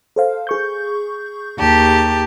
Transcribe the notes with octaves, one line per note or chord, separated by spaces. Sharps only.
A4 C5 F5
G#4 C#6 G6
D#2 G4 A5